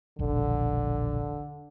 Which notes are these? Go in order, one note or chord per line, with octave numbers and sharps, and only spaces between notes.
E1 A#1 D3